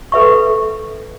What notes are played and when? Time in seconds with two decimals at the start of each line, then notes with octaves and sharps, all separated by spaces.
0.12 A4 B4 E5 C#6